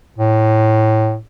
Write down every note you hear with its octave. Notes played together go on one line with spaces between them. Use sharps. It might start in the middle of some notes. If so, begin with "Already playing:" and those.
A2